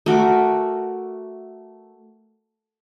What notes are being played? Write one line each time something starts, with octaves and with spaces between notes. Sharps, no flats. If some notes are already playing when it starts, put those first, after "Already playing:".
A3 F#4 A#4 D6